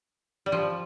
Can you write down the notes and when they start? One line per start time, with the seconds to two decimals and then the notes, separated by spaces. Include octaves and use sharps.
0.46 G3
0.52 F3